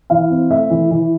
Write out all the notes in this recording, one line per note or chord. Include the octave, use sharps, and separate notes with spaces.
E3 F5
C4
A3 E5
E3
E3